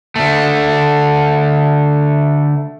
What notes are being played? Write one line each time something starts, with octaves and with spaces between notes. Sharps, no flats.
D3 A3